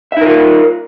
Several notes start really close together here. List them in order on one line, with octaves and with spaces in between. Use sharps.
E5 D#4 A#4 F4